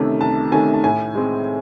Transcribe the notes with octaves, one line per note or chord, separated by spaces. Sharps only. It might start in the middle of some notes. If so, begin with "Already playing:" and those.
Already playing: C2 C3 D#3 A3 C#4
C2 A5
C3 D#3 A3 C#4 G#5
A5
A2 G#5
G#3 C4